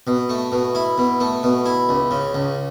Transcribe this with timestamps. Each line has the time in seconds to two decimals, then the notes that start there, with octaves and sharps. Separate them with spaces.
0.07 B2
0.29 A3
0.52 B2
0.75 E4
0.98 B2
1.20 A3
1.43 B2
1.66 E4
1.89 C#2
2.11 C#3
2.35 C#2